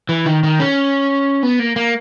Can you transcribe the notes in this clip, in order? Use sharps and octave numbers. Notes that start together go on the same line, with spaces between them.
E3
D#3
D#3
C#4
B3
A#3
A#3